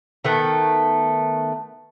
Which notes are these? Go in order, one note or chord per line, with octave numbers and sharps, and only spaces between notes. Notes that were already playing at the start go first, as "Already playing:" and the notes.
D#3 A3 B3